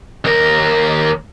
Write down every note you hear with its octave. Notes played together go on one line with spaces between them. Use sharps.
D#2 A#4